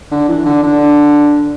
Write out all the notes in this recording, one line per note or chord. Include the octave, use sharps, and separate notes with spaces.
D3
E3
D3
D3